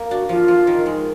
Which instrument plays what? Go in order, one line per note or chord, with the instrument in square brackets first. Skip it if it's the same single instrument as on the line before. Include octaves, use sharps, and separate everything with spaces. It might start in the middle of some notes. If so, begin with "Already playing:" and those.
Already playing: [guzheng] A#3
[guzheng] D4 [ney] F#4
[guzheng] F3 [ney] F4
[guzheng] F3
D#3
G#3